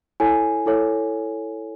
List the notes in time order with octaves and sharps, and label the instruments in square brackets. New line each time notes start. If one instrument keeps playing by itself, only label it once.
[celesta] E4 A4 C#5 G#5
E4 A4 C#5